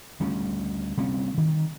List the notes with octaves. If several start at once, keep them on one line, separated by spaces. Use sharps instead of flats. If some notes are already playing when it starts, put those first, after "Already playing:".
D2 G3 A3 C#4
C3 G3 A#3 C#4
D#3